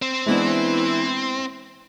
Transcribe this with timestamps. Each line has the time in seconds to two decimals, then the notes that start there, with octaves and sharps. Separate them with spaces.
0.02 C4
0.26 E3 G#3 B3 D4 E4